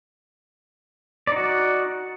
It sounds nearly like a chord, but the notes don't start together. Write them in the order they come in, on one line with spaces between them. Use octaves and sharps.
D5 D#4 F#4